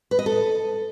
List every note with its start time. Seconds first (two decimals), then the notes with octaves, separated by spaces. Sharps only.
0.11 B4
0.19 D#5
0.26 A4